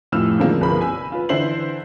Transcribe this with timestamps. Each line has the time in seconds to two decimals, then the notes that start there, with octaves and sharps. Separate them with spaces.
0.12 F1 A2 F3 E6 F6 E7
0.39 D3 D#3 F3 G#3 A#3 C4
0.61 G1 C2 F3 G#4 A#4 B5
0.81 G#5 B5 E6
1.12 F4 B4
1.29 D3 E3 E4 C5 C7 F#7